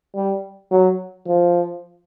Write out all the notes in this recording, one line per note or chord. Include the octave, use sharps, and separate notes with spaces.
G3
F#3
F3